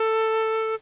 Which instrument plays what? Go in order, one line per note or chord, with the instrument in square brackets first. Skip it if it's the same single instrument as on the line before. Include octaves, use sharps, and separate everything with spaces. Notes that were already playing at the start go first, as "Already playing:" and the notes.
Already playing: [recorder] A4